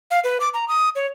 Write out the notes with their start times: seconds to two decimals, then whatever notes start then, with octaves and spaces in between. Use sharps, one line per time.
0.11 F5
0.24 B4
0.40 D6
0.54 A#5
0.68 D#6
0.95 C#5